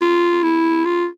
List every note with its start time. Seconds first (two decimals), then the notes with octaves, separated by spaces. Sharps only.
0.02 F4
0.43 E4
0.85 F4